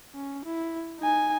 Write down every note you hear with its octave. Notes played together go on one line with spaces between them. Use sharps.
C#4
E4
D#4 G#5